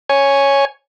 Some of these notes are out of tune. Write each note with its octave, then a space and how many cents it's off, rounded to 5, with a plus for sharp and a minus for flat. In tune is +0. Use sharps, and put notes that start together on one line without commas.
C#5 +0 G#5 +0